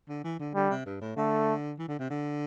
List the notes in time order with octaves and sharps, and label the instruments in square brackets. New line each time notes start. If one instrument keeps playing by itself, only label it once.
[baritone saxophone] D3
E3
D3
[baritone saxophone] D3 [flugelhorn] G3
[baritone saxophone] C3
G2
A2
[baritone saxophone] D3 [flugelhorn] A3
[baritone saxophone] E3
D3
C3
D3